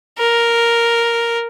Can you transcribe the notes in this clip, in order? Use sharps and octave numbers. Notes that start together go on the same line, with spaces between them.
A#4